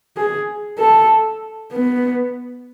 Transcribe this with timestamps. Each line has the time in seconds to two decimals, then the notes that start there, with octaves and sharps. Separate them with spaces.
0.17 G#4
0.79 A4
1.72 B3